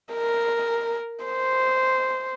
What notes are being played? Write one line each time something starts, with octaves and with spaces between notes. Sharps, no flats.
A#4
C5